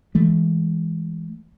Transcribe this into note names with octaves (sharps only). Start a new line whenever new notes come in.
E3 G#3 A3